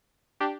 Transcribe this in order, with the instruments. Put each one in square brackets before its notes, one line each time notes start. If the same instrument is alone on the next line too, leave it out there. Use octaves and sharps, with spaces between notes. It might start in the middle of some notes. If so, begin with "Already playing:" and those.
[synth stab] D4 G4